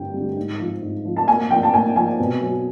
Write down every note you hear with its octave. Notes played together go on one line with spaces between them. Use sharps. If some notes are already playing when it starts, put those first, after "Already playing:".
Already playing: G2 D3 G3 G5
D3 G3
G#2
F3
G#2
F3
A5
A#2 G#5
F3 G5
A5
A#2 G#5
F3 G#5
B2
F#3